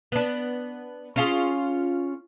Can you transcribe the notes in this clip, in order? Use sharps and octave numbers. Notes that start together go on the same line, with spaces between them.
B3 D4
C#4 F4 G#4